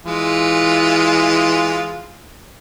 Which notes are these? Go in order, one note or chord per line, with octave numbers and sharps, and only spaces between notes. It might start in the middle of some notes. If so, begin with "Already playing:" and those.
E3 G#3 F4